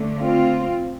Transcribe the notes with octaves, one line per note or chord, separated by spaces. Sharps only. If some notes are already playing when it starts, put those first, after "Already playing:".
Already playing: D3 A3
C4 F4